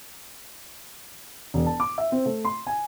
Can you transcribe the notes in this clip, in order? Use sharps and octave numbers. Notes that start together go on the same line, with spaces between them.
E1
A5
D6
E5
C4
A3
C6
G#5